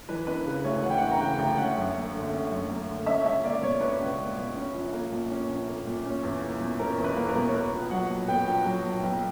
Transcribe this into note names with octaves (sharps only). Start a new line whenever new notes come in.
E3 B4
E1 B4
C#3
D2 C#5
E3 F#5
G5
E1 F#5
A#5
C#3 G5
D2
C#4 F#5
F#2
A#3
D3
C#4
F#2
A#3
D3
C#4 E5
C#2 E5
A#3 D5
B2 C#5
C#4 B4
C#2
A#3
B2
C#4
A#1
A#3
A#2
C#4
A#1
A#3
A#2
C#4
E2
A#3
B2
C#4 A#4
E2
B4
A#3
A#4
B2
C#5
B3 B4
A#1
F#3 F#5
A#2
B3 G5
A#1
F#3
A#2
B1